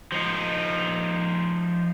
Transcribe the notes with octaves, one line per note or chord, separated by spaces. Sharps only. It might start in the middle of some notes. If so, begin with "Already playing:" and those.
F3 D#4